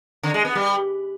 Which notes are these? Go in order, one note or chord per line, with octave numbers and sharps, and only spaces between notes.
D3
G#3
B3
G3